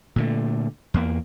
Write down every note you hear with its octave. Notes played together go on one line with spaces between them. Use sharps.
A#2 D3 A3
E2 A#3